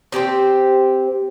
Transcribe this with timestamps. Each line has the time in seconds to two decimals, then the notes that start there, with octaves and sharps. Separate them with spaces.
0.12 C4 G4 G#4 C5